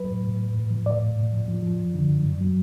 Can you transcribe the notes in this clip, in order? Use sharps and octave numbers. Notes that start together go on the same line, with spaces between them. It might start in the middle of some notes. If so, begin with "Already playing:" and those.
Already playing: F#3 B4
A2
A2
A2
A2
F3
A2 D5
A2
A2
F3
F3
F3
F#2
D3
F#2
F#2
F#3